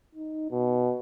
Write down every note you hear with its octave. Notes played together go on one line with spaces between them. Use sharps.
D#4
B2